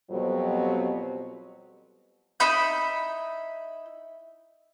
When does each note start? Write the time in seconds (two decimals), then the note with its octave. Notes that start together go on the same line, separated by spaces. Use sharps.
0.10 F2 B2 F#3 G3 C4
2.40 D#4 E4 B5 G6